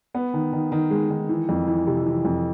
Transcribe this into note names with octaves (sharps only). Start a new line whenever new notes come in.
B3
D#3
D#3
D#3
G#3
D#3
E3
F2
E3
C3
E3
F2